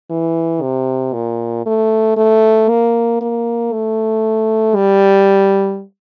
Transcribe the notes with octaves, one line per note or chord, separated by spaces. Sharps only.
E3
C3
A#2
A3
A3
A#3
A#3
A3
G3